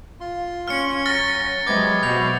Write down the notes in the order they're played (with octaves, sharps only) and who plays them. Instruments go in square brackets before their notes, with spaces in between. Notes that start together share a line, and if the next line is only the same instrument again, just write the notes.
[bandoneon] F4 C6
[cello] C#4 [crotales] F6 C#7
[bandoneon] F#3 [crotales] F6 A6 A#6
[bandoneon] C3 B3 [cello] F#3 G#3 [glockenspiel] D6 G#6
[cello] B2 F#4 [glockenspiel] G6 F7